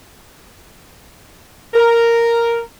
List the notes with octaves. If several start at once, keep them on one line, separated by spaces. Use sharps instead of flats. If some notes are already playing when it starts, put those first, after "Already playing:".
A#4